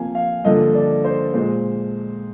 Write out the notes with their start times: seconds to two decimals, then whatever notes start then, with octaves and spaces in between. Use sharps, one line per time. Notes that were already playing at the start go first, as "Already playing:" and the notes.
Already playing: C3 F3 A#3 F5 G#5
0.15 F5
0.45 G2 D3 F3 A#3 D#5
0.75 D5
1.04 C5
1.34 A#2 G#3 C5